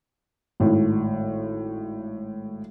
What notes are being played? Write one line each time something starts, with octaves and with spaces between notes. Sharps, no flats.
G#1 A2